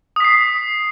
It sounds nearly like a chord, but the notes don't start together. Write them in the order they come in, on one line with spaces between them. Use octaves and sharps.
D#6 B6 C7